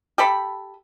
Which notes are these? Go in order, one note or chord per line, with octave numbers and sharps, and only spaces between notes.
G4 A4 B5